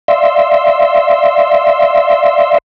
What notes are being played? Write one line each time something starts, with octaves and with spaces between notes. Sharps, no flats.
D5 E5 F5 C6 E6